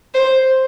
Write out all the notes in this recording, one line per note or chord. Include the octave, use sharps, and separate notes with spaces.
C5